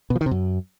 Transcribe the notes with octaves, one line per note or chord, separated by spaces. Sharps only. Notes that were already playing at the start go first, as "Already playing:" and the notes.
B2
F3
D#3
C3
F#2